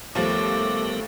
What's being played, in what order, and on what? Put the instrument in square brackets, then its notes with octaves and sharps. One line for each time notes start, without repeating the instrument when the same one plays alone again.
[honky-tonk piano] D#2 F3 [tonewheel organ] G3 B3 A#4 [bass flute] A3 [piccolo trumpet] D6